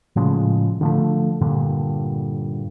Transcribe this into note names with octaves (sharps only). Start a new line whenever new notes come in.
A2 C#3 F3 G#3
D3 F3 A3
G2 A#2 D3